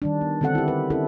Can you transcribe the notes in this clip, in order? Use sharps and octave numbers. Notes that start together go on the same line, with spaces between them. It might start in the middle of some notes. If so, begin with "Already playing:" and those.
D#3 G3 D4
B3
D3 D#3 C4 A4 F#5
E4 G4
B4
C4 C#4 E4 A4